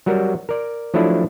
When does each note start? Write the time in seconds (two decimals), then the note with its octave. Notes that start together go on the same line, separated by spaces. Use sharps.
0.06 F#3 G3 F#4 A#4
0.49 A#4 D5
0.94 F3 F#3 A3 D4 E4